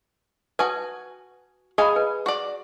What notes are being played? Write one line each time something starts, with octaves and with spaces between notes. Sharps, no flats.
F#4 B4 G#5 A5 D#6
G#4 D#5 F5 G#5 A#5 B5
B4
F#4 D5